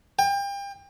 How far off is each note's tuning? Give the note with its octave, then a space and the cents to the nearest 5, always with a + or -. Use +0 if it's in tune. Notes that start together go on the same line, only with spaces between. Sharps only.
G5 +35